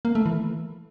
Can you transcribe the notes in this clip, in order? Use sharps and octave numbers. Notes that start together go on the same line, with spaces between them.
A#3
A3
E3